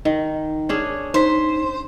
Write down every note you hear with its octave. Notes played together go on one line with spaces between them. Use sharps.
D#3 D#4
C#4 D4 G#4
D#4 C5 B6